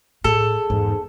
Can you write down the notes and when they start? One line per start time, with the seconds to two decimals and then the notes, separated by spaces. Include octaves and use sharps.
0.24 A2 G#4 A4
0.70 E2 G#2